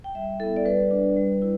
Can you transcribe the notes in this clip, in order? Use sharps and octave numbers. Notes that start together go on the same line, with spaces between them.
G5
G3 E5
B3 E4 A4
D5
G3 B4
D4
G3
E4